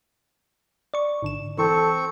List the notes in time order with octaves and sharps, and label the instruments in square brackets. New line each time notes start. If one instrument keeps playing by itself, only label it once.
[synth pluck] D5 C#6
G#1 D3 E7
[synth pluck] E3 [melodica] C4 C#6 [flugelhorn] A4